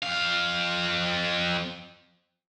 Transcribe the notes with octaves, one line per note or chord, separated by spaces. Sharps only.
F2 F5